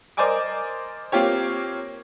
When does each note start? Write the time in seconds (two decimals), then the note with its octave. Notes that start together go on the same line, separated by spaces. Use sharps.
0.17 A#4 C5 D5 D#5 G#5 D6
1.12 A#3 C4 F4 G4 C#5